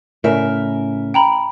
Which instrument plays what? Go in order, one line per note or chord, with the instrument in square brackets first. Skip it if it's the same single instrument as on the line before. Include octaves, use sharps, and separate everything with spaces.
[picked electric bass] A2 [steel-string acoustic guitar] C#3 A#4 E5
[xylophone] G5 A#5 B5